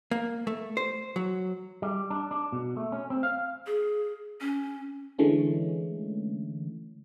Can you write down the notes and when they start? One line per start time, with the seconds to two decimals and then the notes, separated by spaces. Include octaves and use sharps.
0.11 A#3
0.47 A3
0.77 C5
1.16 F#3
1.82 G3
2.10 D4
2.31 D4
2.52 B2
2.77 A3
2.92 C#4
3.10 C4
3.23 F5
3.67 G#4
4.41 C#4
5.19 D3 E3 G#3 A3 C#4